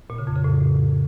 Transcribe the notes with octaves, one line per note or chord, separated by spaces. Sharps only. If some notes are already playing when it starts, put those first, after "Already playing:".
A#2
C#3
F2
C#3
A2